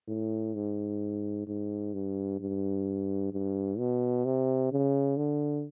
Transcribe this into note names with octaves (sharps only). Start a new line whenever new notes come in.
A2
G#2
G#2
G2
G2
G2
B2
C3
C#3
D3